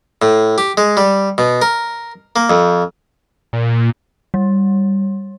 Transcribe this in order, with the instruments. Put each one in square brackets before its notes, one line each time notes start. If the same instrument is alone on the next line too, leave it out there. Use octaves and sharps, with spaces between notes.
[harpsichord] A2
G4
G#3
G3
B2
A#4
A#3
F2
[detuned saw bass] A#2
[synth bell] G3